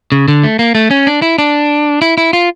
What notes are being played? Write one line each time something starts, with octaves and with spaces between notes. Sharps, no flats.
C#3
D3
A3
A#3
A3
C#4
D4
E4
D4
E4
E4
F4